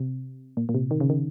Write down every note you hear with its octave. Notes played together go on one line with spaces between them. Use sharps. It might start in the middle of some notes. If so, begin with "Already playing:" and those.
Already playing: C3
A#2
A#2
C3
D#3
C#3
D#3